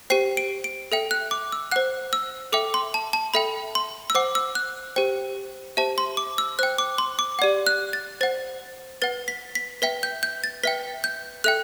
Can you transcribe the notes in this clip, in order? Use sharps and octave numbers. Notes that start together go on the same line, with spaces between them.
G4 C5 G5 C7
D7
D7
A4 E5 G5
F#6
D6
E6
C5 F#5 F#6
E6
A4 E5 G5 D6
C6
A5
A5
A4 E5 G5 B5
C6
E6
C5 F#5 D6
E6
F#6
G4 C5 G5
G4 C5 E5 A5
C6
D6
E6
C5 G5 F#6
D6
C6
D6
G4 D5 F#5
F#6
A6
C5 F#5 A6
B4 F#5 A6
B6
B6
B4 E5 G5 B6
G6
G6
A6
B4 E5 G5 B6
G6
A4 E5 G5 F#6